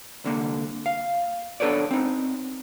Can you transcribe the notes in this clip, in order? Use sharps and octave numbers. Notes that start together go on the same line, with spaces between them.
C2 D3 A#3
F5
B3 D4 A4 B4 C#5 D5
C4 D#4